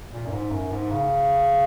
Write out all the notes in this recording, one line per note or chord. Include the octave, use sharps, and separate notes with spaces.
A#2
F#2
G#2
F#2
G#2
C#3